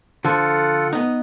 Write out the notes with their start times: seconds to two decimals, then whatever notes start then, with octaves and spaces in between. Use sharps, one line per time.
0.25 D3 F3 F4 A4 F#5
0.93 B3 D#4